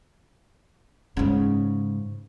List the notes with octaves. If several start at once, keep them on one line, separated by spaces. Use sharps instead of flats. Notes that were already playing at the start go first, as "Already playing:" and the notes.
G#2 C#3